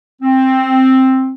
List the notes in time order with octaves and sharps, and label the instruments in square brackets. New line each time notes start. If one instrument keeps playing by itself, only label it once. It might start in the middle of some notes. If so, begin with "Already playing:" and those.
[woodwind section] C4